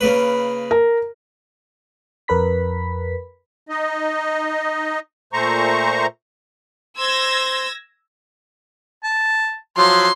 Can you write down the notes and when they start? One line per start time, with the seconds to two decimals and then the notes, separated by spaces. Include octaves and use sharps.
0.01 C#3 A#3 B4
0.71 A#4
2.28 F2 A#4 B4 B5 B6
3.69 D#4 D#5
5.33 A#2 A3 C5 A#5 C#6
6.97 C5 C6 E6 G#6 A#6
9.04 A5
9.78 F3 F#3 C6